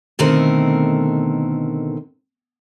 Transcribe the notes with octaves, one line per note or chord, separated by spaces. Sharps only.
B2 D3 D#3 A3 C4 A#4